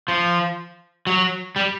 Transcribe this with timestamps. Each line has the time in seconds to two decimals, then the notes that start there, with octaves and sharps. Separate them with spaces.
0.08 F3
1.07 F#3
1.56 G3